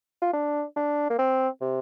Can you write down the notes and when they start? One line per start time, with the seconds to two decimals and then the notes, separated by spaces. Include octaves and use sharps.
0.22 F4
0.33 D4
0.76 D4
1.10 A#3
1.18 C4
1.61 C3